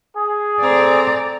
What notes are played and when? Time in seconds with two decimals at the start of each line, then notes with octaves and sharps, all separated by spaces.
0.17 G#4
0.62 C4 A4 D5 A#5